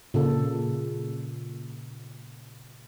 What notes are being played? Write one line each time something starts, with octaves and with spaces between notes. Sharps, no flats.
A#2 C#3 A4